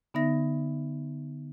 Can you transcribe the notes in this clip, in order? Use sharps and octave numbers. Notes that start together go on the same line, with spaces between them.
D3 B3 D#4 E5 A#6